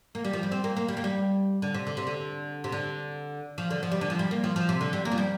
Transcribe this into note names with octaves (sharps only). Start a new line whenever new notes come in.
A#3
G3
F3
G3
C4
A#3
A#3
G3
A#3
G3
D3
C3
D3
C3
D3
C3
D3
F3
D3
F3
G3
D3
F3
G3
A#3
F3
F3
C3
D3
G3
A#3
F3
G3